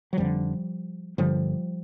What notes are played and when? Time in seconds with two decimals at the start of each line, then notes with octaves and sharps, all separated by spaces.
0.13 F#3
0.17 F1 F2 D3 F3 G3
1.18 G1 G2 D3 F3 G3